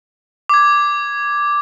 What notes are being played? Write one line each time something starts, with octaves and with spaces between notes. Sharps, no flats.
D6 G#6